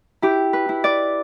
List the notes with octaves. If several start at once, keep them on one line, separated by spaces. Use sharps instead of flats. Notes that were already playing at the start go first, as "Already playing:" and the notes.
E4 G4
B4
E4
D5